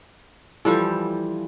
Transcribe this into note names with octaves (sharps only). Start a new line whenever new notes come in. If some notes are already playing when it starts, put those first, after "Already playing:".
E3 F3 G3 A4